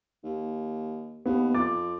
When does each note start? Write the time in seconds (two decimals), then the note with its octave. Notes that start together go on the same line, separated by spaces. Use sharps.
0.24 D#2
1.26 D#2 B3
1.54 F2 D6 A6